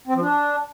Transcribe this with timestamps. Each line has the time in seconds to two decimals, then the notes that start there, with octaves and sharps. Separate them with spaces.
0.07 C4
0.15 F3
0.22 D4